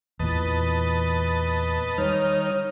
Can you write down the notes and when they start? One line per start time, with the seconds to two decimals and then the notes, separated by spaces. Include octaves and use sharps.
0.20 E2 A#2 E3 B4 D#5 A5
1.98 D#3 G3 D#4 C#5 F6